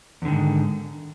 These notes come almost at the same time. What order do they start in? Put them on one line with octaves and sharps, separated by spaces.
E2 D3 D#3 G#2